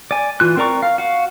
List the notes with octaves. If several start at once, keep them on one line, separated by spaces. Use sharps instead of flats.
D5 G#5
E3 F4 F#6
C4 A#4 D5 A#5 C#6
F5
F#4 F5